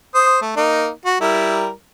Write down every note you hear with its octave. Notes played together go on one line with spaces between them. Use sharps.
C5 D#6
A3
A#3 D#4
F#4
G3 E4 A#4